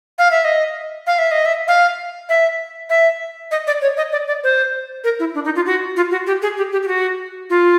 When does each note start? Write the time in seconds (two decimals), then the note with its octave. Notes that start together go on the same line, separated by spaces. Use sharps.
0.18 F5
0.31 E5
0.45 D#5
1.07 F5
1.19 E5
1.31 D#5
1.46 E5
1.68 F5
2.29 E5
2.90 E5
3.51 D#5
3.67 D5
3.82 C#5
3.97 D#5
4.12 D5
4.27 D5
4.44 C5
5.04 A#4
5.20 E4
5.35 D4
5.45 D#4
5.56 F4
5.66 F#4
5.96 F4
6.11 F#4
6.27 G4
6.42 G#4
6.57 G4
6.72 G4
6.83 G4
6.88 F#4
7.50 F4